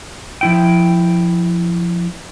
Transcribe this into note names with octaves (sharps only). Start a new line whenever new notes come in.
F3 E4 G5